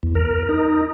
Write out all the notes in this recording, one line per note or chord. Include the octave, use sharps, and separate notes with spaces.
E2
A#4
D#4